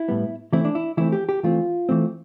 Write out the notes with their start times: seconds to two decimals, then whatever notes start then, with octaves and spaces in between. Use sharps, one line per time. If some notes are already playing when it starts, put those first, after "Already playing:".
Already playing: E4
0.08 A2 G3 B3
0.53 E3 A3 C4 E4
0.65 D4
0.75 E4
0.97 E3 A3 C4 E4
1.12 G4
1.29 G4
1.43 E3 A3 C4 F4
1.89 E3 A3 C4